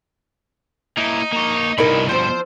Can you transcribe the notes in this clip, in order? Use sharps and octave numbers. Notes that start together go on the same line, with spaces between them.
A#3 D#4 E4
A#3 C#5
C2 G2 B2 D#4 E4 A#4 B5
F3 C4 C5